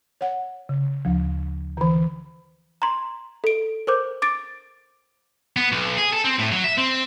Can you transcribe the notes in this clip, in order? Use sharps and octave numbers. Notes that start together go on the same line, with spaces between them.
C#5 F#5
C#3
D2 F3
D3 E3
A#5 C6
A4 D7
A#4 C5 D6 G6
D6 A6 D7
B3
B1
G#4
A4
C4
A2
F#3
E5
C4